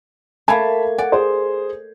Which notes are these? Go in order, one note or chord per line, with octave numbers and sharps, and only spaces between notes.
A3 A#3 A5 B5 G#6
D5 F#5
G#4 C5